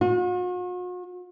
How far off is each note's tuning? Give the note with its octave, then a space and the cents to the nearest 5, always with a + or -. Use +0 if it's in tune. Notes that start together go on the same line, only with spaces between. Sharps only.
F#4 -45